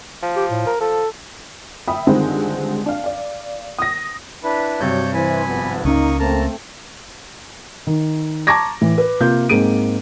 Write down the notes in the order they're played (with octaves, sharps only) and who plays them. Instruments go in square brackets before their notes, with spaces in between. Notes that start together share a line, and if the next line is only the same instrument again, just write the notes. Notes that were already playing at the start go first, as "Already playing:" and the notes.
[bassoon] F3
[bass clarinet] G4
A2
A#4
[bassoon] F3 [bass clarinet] A4
[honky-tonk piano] E5 G5 B5 D#6
G2 D3 D#3 G#3 C4 F4
D4 F5
D5 F5
D#6 A#6
[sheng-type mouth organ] D4 E4 B4
[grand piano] G2 C3 [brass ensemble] F#3 [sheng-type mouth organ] C#5 G6
[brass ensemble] E3 C5 [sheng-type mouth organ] G#5 B5
[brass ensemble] G#1 F3 B3
[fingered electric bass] C#2 C#4 [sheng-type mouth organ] A#3 C#6 D#6 [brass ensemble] D#4
[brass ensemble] A3 C4 [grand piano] A#3 [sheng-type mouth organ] A5 A#5
[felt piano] D#3
A5 A#5 C#6 D6 G#6 A#6
A2 E3
B4
C3 A#3 F4 G6
G#2 A#3 C4 G#4 D7 D#7